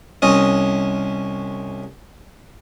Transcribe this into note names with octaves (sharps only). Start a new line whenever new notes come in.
C2 C#4 D#5